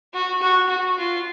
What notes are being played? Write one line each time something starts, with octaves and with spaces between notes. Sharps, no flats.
F#4
F#4
F#4
F4